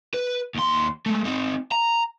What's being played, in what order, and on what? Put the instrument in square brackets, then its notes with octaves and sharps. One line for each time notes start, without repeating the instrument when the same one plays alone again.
[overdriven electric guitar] B4
D#2 C6
G#3 A3
C4 D#4
A#5